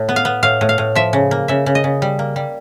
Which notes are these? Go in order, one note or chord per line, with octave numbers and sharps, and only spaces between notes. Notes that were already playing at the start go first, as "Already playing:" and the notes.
Already playing: A2
B3
F5
B3
A2 F5
A2
F5
A2
F3 E5
C#3
A#3
C#3 E5
C#3
D#5
C#3
G3
A#3
G3